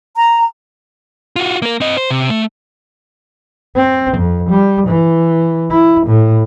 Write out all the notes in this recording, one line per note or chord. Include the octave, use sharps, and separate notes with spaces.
A#5
F4 F#4
A#3 A#4
C4 D#5
C5
C3
A3
C4
F2
G3
E3
E4
A2